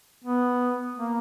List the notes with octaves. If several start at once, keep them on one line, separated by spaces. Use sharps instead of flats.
B3
A#3